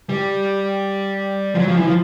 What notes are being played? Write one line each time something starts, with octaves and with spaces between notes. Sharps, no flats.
G3
F3
F#3
F3
E3
F3